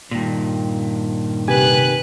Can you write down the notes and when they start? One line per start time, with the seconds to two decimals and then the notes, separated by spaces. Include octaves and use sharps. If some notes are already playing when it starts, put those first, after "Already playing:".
0.11 G2 A#2 D#3
1.48 C3 G4 B4 G#5 F#6